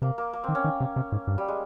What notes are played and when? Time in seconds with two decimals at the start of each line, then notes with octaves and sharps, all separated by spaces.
0.02 C3 A#3
0.18 A#3
0.33 A#3
0.44 D#3 C4
0.55 C#4
0.64 D#3
0.80 C3
0.96 C3
1.12 G#2
1.27 G2
1.38 G3
1.48 G#3